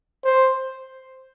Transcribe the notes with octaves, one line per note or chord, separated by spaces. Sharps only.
C5